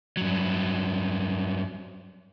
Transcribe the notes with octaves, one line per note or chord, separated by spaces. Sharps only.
G2 F#3